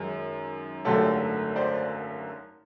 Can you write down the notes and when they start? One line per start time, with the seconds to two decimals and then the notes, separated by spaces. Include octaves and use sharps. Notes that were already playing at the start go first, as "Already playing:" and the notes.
Already playing: F#2 D#3 G#3
0.85 G#1 F#2 D3 F#3 A3 G4 A4
1.56 C5 D5